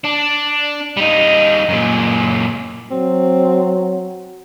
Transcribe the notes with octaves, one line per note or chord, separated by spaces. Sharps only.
D4
G3 D#4
F#2 A#2
F#3 C4